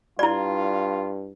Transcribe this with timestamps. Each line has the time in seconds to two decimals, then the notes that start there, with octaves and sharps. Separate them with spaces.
0.19 G2 E4 F4 D5